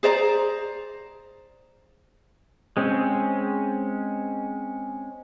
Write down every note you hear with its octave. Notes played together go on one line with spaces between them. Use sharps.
G#4 C5 D5 A#5
G#3 C4 C#4